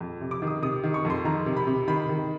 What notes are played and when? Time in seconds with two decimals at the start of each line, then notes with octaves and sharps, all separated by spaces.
0.01 F2
0.21 C3
0.31 D6
0.42 D#3
0.47 D#6
0.62 C3 D#6
0.84 D#3
0.94 C#6
1.05 F2
1.10 C6
1.25 D#3 A#5
1.46 C3
1.57 B5
1.67 C3
1.88 D#3 B5
2.09 D#3